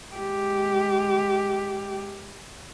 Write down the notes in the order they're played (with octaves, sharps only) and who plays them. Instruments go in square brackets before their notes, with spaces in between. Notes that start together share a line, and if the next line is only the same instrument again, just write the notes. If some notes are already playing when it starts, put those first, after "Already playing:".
[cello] G#3 G4